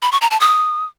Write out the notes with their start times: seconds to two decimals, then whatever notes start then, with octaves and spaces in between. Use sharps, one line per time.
0.02 B5
0.12 C#6
0.21 A#5
0.31 A5
0.40 D#6